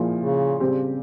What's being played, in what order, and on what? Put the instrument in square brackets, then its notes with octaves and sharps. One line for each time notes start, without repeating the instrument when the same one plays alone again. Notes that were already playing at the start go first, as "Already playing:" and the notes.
Already playing: [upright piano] A#2 F3 A#3 E4 G#4
[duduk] C#3
[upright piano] C#3 G3 C4 G4